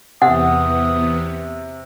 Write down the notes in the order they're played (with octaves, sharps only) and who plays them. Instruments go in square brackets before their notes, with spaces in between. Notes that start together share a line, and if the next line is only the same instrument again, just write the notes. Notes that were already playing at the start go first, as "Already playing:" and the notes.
[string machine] E2 B3 [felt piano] C3 [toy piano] F#5 [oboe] D#6